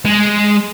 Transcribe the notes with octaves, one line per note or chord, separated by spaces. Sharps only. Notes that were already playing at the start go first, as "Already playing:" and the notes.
G#3